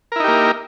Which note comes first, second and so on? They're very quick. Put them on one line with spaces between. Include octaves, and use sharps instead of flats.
A#4 E4 D#4 G4 A#3